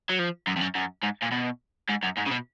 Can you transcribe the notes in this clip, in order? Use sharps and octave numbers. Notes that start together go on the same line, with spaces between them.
F#3
F3
F#2
F2
F#2
F#2
G#2
A#2
B2
G#2
F#2
G#2
C#3
B2